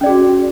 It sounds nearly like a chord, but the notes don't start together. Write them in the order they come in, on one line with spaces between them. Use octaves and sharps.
C#4 D5 G#4 F#4